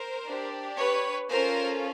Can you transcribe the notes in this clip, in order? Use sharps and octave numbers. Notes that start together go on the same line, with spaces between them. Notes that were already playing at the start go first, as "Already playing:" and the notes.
Already playing: A#4 C5
D4 G4
B4 C#5
C#4 F4 A4 A#4 C5